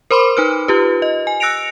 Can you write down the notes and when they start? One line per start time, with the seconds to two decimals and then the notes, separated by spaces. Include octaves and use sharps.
0.11 A#4 C5 B5 C6 D6
0.37 D#4 B4 F6
0.68 F4 G4 B4
1.02 D#5
1.27 G#5
1.40 E6 F#6 A#6 C#7 D7 F7